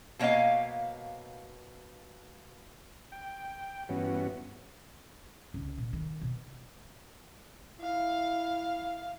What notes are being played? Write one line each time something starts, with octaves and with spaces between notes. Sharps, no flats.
B2 A#3 C#5 D#5 F5
G5
G2 E3 B3 C#4 F#4
C#2
A#2
D#3
B2
E4 F5